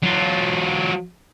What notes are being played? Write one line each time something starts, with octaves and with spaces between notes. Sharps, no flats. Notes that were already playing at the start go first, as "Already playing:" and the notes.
F#3 F4